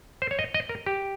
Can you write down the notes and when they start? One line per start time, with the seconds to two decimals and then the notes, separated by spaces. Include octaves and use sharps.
0.22 C5
0.31 C#5
0.39 D#5
0.54 D#5
0.69 A#4
0.86 G4